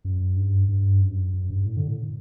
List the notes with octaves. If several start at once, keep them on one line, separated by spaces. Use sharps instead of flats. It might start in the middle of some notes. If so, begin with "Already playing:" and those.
F#2
G2
G2
F#2
F#2
G2
A2
D3
A2